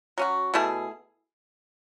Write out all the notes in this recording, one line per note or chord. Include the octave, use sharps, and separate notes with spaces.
F#3 C#4 F#4
B2 A3 E4 G#4